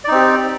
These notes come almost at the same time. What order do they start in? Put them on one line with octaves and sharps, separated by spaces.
D5 D#4 C4 G4